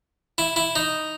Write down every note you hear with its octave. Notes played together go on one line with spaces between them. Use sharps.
E4
E4
D#4